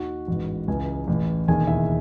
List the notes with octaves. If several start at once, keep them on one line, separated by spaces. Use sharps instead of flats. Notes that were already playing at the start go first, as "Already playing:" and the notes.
Already playing: D#2 D#3 F#4 F#5
A1 G#2 E3
C#2 C#3 E3 G#4 G#5
A1 A2 E3
E1 D#2 D#3 G#4 G#5
E4 E5